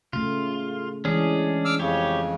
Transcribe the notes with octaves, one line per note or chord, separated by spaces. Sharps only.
C#3 A3 F4
E3 G#3 C#4 D4 G#4
D6 E6 F6
F2 C#3 G4 C#5